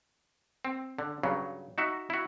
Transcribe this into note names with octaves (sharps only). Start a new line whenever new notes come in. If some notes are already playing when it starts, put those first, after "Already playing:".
C4
D3
G2 C#3 F#3
D#4 F#4 E5
E4 F#4